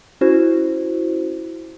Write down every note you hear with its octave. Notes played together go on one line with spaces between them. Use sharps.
C#4 E4 F#4 C5